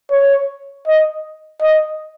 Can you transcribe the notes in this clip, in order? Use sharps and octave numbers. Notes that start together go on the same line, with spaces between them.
C#5
D#5
D#5